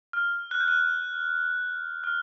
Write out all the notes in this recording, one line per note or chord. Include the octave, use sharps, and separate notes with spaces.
F6
F#6
G6
F#6
F6